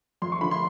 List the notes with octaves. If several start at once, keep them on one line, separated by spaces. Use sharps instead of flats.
F2 C6
C#6
D3 F3 B5
C6